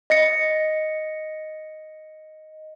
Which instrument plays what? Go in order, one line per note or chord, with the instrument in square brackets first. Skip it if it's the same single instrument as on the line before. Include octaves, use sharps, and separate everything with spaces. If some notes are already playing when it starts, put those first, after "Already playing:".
[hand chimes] D#5 A#6 C#7